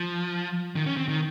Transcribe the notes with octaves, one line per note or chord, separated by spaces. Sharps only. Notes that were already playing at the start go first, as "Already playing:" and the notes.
Already playing: F3
D#3
C#4
C4
D#3